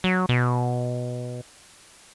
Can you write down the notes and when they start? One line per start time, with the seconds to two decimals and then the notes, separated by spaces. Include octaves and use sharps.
0.04 F#3
0.29 B2